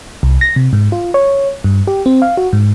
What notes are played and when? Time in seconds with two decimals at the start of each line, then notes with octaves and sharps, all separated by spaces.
0.23 C2
0.41 A#6
0.56 C3
0.73 G#2
0.92 F4
1.14 C#5
1.64 G2
1.87 G4
2.06 C4
2.22 F5
2.37 F#4
2.53 G#2